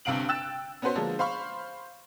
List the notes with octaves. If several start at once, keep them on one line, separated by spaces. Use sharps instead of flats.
G1 G2 C3 F5 D7 F#7
G5 E6 F#6 A6 E7
B3 C#4 F#4 B4 C5
D3 F3 G#3 A#3 D4
C5 F5 B5 C#6